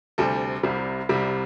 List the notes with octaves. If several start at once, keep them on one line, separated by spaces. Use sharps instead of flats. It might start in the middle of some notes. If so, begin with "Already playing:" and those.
D2 C3 G3 A4
C2 C3 G3
C2 C3 G3